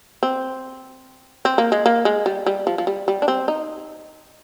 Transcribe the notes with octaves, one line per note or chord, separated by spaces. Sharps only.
C4
C4
A#3
G#3
A#3
G#3
G3
G3
F3
F3
G3
G3
D4
C4
D#4